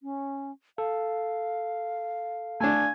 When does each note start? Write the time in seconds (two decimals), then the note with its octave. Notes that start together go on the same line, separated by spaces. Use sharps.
0.03 C#4
0.78 A4 F5
2.60 A3 D4 G#5